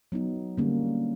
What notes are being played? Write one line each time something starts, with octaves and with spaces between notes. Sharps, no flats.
F#3 B3 D#4
D3 G3 A#3 C#4